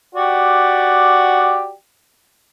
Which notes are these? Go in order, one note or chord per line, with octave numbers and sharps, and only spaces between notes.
F#4 G4 D5